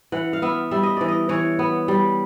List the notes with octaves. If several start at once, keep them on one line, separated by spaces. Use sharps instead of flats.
E3 F#5
F5
B3 E5
G3 E5
D#5
E3 D5
D#5
E3 C#5
B3
G3